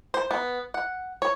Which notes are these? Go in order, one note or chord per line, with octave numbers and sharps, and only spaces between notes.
C5
B3
F#5
C#5